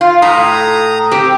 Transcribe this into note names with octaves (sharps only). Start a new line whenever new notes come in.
F4
A2 A#5 D#6
C4 G4